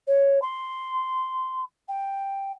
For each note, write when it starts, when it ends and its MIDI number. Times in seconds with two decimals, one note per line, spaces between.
0.07 0.39 73
0.42 1.61 84
1.88 2.52 79